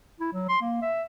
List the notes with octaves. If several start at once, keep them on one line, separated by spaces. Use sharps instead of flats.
E4
F#3
C6
A#3
E5